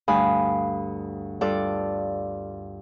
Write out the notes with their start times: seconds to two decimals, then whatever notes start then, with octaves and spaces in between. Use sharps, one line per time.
0.08 D2 G2 F5 G#5 B5 D#6
1.41 G2 F4 A4 D5